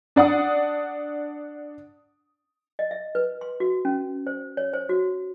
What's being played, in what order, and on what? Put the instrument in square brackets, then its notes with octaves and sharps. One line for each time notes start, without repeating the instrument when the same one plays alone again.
[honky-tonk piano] D4 D5 F#5 D#6
[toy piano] D#5
E5
B4
C6
F#4
C#4
C5
C#5
C5
F#4